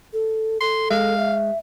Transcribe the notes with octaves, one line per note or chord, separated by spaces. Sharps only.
A4
A4 C6
G#3 F5
E5